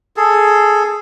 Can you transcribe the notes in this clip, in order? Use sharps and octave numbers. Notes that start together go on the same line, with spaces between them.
G#4 A4